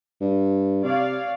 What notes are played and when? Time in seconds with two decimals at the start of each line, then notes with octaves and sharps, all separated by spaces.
0.21 G2
0.84 C3 C#5 D5 F5